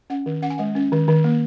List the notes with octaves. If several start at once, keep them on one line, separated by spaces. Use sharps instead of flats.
C#4 F#5
D#3
C#4 F#5
G#5
G#3 F#5
C#4
D#3
D#3
A#3